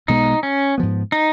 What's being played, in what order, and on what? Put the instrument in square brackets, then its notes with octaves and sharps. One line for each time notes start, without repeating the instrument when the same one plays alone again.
[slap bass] B1 B2 G#3 B3 [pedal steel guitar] D#4
[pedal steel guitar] C#4
[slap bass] G#2 F3 B3
[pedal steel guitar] D#4